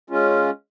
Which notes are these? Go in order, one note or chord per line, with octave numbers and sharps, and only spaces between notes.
G#3 C#4 F4